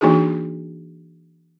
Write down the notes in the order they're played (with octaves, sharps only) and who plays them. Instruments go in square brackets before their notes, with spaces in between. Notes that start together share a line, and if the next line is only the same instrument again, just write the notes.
[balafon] E3 A#3 D4 D#4 F#4 G#4